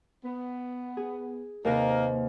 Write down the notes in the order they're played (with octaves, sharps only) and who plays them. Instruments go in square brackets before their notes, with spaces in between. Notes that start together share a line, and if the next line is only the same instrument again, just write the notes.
[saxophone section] B3
[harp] G#4
[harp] D#2 C3 B4 [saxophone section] A#3 D#4 A#4